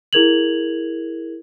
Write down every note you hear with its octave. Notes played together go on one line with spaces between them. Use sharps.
E4 G#4 A#4 G#6 F7 F#7